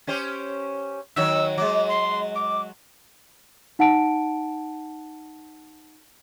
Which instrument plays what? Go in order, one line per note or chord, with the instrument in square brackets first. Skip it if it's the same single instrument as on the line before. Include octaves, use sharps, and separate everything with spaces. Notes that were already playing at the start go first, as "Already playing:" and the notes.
[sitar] C#4 G4 C5
[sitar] D#3 F#3 C#5 [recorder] E6
[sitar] F#3 G#3 [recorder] D6
[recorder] C6
D6
[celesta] D#4 F#5 A5 D7